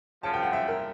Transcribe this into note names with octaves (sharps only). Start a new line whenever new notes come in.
F#2 C#3 F3 A5
G5
F#5
E5
A#4